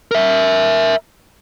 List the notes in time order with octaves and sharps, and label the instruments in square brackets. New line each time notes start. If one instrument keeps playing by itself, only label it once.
[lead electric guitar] A#4 E5